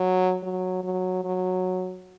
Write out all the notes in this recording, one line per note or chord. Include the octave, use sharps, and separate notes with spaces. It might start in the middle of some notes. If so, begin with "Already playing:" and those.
Already playing: F#3
F#3
F#3
F#3